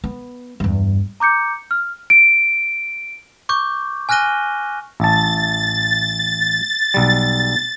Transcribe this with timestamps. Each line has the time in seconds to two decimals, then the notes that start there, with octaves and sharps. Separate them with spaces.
0.04 B3
0.60 E2 G2
1.20 A#5 D6 G6 C#7
1.71 F6
2.10 D7
3.49 C#6 D6 G6
4.09 G#5 F6 F#6 A#6 D#7 G7
5.00 A1 A5 A6
6.94 B1 G3